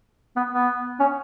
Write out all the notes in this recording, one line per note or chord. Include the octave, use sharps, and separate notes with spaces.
B3
B3
C#4